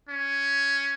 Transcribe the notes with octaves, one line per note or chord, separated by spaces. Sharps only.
C#4